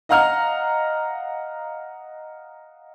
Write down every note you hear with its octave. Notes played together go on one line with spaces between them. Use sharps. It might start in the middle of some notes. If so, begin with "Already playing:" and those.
D#5 F5 F#5 A#5 F6